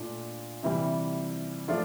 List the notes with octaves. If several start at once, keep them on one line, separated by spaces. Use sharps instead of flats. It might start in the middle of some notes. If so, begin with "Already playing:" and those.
Already playing: A#2 A3 D4 F4
C3 E3 G3
F3 A3 D4 F4